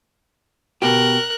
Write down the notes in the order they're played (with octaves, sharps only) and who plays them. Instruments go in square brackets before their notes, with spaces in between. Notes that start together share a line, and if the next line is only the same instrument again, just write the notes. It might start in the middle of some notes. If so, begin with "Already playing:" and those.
[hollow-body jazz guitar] B2 G4 [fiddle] A#4 F#6